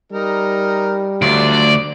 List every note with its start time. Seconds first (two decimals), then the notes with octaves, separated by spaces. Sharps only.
0.12 G3 D#4 A#4
1.22 D2 F#3 F4 D5